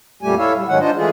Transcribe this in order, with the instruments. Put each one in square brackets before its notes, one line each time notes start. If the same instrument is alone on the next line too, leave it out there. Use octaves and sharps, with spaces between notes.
[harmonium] F2 A#2 G3 A3 G4 G#5
E4 A4 C#5 E5 F5
G3
G#2 D#3 F#3 G#3 C#4 F#5
D4 D#4 F4 C5 D#5
E3 G#3 A3 F4 G#4